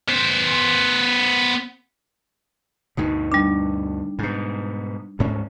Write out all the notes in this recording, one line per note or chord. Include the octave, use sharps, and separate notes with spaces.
B3 C5
D2 G2 B2 D#4
G3 D4
G#2 B2
D2 G#2 C#4